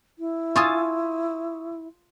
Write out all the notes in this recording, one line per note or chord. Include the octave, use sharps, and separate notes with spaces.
E4
F4 G#5 A5 C#6 D#6 E6